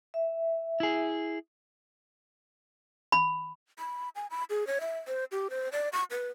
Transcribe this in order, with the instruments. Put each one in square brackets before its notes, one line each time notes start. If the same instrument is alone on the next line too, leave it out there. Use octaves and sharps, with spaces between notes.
[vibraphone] E5
[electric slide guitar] E4 G#4
[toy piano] B5
[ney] B5
G#5
B5
G#4
C#5
E5
C5
G4
C5
D5
C#6
B4